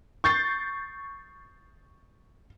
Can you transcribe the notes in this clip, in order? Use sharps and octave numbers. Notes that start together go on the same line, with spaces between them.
C#6 G6 A6 C7